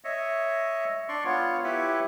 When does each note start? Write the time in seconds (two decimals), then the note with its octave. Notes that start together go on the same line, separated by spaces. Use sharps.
0.04 C#5 D#5 E5
1.09 D4 D5 C6 C#6
1.25 B3 F4 C#5
1.64 E4 G4 B4 C#5 E5